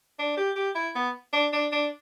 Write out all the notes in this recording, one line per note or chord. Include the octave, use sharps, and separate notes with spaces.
D4
G4
G4
E4
B3
D4
D4
D4